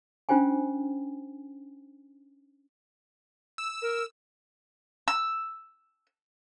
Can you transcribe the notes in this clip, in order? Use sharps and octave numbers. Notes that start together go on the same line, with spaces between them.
C#4 D4 F4 C5 G5 G#5
E6
A#4
E6